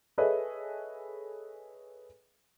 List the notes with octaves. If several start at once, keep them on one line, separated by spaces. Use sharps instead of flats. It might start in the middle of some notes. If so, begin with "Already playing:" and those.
G#4 A4 B4 C#5 D#5 E5